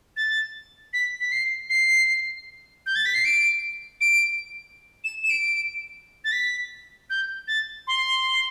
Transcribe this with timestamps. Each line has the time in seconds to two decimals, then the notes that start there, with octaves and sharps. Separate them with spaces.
0.17 A6
0.93 B6
1.21 B6
1.32 C7
1.70 C7
2.86 G6
2.96 A6
3.06 B6
3.14 C7
3.25 D7
4.01 D7
5.04 E7
5.24 E7
5.30 D7
6.24 A6
6.32 B6
7.10 G6
7.48 A6
7.87 C6